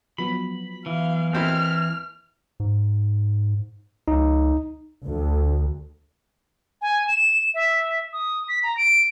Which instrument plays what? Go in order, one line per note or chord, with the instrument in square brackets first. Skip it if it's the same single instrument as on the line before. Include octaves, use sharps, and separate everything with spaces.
[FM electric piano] F3 F#3 B3 [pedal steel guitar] B5
[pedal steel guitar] E3 [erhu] F5
[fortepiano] D#2 C4 E4 [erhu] F6
[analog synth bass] G#2
[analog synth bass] C#2 [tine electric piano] D#4
[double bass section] D2
[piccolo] G#5
E7
E5
D#6
B6
A#5
D7